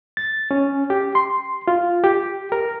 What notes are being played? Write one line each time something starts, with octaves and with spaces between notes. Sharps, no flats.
A6
C#4
G4
C6
F4
G4
A#4